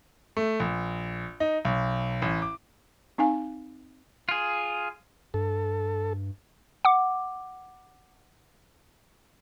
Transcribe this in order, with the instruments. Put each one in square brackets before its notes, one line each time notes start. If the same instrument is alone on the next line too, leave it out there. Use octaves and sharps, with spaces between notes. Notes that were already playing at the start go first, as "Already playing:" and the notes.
[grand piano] A3
A#1
D#4
B1
A1
D6
[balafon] C4 D#4 F5 G#5
[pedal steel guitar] F4 G#4
[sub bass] G2 [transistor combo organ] A4
[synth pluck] F#5 D6